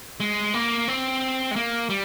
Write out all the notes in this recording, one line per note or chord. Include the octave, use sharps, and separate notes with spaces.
G#3
A#3
C4
G#3
A#3
G3